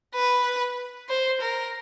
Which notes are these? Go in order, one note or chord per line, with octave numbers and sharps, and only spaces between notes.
B4
C5
A#4